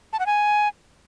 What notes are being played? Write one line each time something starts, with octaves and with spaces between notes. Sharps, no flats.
A5
F#5
G#5